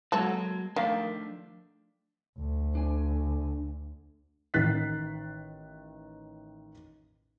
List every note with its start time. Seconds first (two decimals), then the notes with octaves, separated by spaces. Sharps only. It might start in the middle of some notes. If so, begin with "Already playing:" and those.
0.12 F#3 G#3 A#3 F#4 A4
0.76 D#3 F3 A3 D4 F5
2.39 D2
2.75 D4 G#5
4.54 A1 D#3 F#6 A6 B6 C7